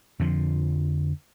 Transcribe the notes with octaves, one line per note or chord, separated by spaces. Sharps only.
F2 D3 F3